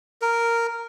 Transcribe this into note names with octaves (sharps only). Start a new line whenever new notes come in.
A#4